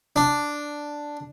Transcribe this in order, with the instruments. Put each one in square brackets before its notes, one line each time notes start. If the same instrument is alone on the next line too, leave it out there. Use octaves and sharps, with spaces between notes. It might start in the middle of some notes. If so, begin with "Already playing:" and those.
[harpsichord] D4